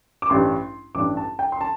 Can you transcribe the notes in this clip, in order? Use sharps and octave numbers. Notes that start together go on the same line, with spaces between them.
D6
A1 G2 G3 D4 C6
A1 G2 G3 D4 D6
A5
G5
C6
A5